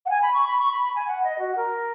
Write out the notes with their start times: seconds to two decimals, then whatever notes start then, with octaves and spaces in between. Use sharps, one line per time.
0.06 F#5
0.10 G#5
0.22 B5
0.34 C#6
0.47 B5
0.58 C#6
0.71 B5
0.83 B5
0.96 G#5
1.08 F#5
1.24 D#5
1.39 F#4
1.56 A#4